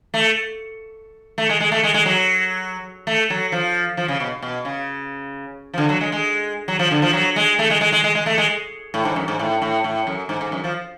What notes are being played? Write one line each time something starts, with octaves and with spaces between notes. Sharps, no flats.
A3
A3
G#3
G#3
A3
G#3
G#3
F#3
A3
F#3
F3
F3
C#3
B2
B2
C#3
F3
D3
F#3
G#3
G#3
F#3
F3
D3
F3
F#3
G#3
A3
G#3
G#3
G#3
G#3
G#3
A3
G#3
A2
G#2
F#2
G#2
A2
A2
A2
F#2
G#2
G#2
F#2
F3